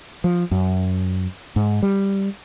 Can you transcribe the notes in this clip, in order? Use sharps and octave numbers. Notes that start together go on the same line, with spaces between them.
F3
F#2
G#2
G3